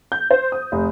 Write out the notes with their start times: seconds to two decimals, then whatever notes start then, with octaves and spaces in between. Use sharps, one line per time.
0.12 G6
0.31 C5
0.52 D#6
0.72 F1